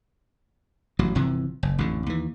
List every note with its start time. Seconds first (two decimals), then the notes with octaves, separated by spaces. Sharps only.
0.99 A1 F#3
1.15 G1 C3 E3 F3
1.63 F#1
1.79 A1 F2 D3
2.06 D#2 E3